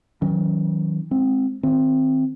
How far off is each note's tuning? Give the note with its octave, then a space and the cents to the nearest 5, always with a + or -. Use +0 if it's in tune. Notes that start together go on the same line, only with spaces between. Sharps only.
D#3 +40 F#3 +0 C#4 +0
G#3 +0 C4 +5
D#3 +5 C4 +0